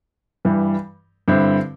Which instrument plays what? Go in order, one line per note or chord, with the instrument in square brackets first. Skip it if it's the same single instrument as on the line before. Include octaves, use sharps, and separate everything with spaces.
[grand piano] G2 E3 G3
G2 D3 C4 E4